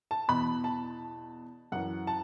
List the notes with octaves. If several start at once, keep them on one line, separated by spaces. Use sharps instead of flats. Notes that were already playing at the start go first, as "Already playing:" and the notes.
A5
E2 B2 B5
A5
F#2 E3 F#5
A5